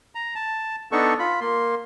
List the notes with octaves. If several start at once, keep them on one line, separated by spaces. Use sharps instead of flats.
A#5
A5
B3 D4 D#4 A4 C#6
F4 B5
A#3 C6